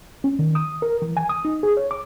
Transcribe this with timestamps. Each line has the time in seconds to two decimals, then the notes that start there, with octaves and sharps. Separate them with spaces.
0.24 C#4
0.39 D#3
0.55 D#6
0.82 A#4
1.02 E3
1.17 G#5
1.30 D#6
1.45 D#4
1.63 G#4
1.77 C#5
1.91 D6